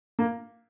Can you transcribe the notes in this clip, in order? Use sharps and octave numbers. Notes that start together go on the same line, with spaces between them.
A#3